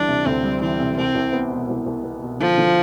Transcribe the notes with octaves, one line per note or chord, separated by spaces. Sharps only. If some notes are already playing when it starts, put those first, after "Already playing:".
Already playing: D2 E3 G3 D4
C3
D2 C4
G3
E3 C4
C3
C2 C4
C2
B3
B2
C2
C2
B3
B2
D3 F3
D3